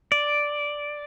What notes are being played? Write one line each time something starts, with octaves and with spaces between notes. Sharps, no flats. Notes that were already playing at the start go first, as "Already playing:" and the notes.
D5